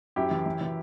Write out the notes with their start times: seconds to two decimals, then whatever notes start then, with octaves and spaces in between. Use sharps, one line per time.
0.16 F#2 E4 G4
0.31 E3
0.46 E3
0.61 E3